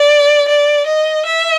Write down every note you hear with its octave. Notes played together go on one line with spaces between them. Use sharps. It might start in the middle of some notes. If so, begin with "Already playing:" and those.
Already playing: D5
D5
D#5
E5